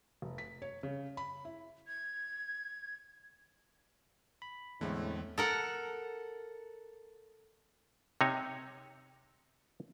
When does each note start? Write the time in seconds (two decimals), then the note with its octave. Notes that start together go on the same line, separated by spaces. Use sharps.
0.22 F1
0.38 B6
0.62 C#5
0.83 C#3
1.17 B5
1.45 E4
1.88 G#6
4.42 B5
4.81 E2 A2 D3 G#3 C4
5.38 A4 A#4 F#5
8.21 C3 D#4 C#5